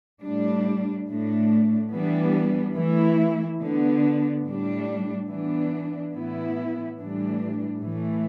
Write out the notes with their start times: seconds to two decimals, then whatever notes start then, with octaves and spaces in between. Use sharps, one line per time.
0.22 A2 G3 D4
1.07 A2 A3 D4
1.91 E3 G3 B3 D4
2.76 E3 A3 E4
3.60 D3 B3 D4
4.45 A2 G3 D4
5.30 E3 B3 D4
6.15 A2 E3 B3 E4
6.99 A2 E3 G3 D4
7.83 A2 E3 A3